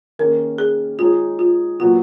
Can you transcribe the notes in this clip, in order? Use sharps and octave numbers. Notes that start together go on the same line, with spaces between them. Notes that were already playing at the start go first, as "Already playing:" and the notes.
D#3 A#3 C#4 G#4 A#4
G#4
G#3 D#4 F4 G#4 C#5
F4
A#2 F#3 B3 F4 F#4